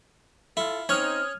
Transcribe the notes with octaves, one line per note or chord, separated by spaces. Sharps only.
E4 F4 A4
C4 C#4 D#4 C#5 D#6 F6 G#6